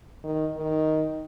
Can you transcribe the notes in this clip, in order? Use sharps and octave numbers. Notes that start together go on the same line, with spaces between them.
D#3
D#3